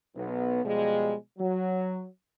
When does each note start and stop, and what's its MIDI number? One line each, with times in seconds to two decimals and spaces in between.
0.15 0.63 35
0.15 0.63 59
0.64 1.14 47
0.64 1.14 53
0.64 1.14 55
0.64 1.14 56
1.39 2.05 54